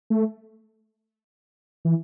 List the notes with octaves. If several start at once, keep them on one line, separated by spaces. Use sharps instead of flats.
A3
E3